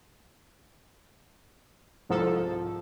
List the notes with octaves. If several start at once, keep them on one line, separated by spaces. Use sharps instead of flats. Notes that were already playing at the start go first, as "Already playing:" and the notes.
C2 G#2 F3 A4